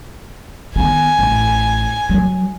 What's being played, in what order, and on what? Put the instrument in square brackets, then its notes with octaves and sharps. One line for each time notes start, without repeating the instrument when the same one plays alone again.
[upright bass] D#3 B3 [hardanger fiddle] G#5
[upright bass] A1
F#3